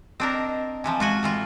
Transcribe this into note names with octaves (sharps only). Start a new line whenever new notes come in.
C4 D4 A#4 D#5
D#5
D#5
C3 E3 F3 G#5
G#3 F4 F#4 G#5
A2 E3 F4